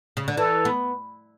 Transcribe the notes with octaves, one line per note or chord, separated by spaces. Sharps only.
C#3
D3
E3 A4
B3